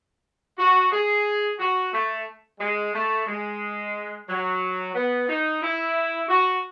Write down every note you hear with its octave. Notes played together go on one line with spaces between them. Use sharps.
F#4
G#4
F#4
A3
G#3
A3
G#3
F#3
B3
D#4
E4
F#4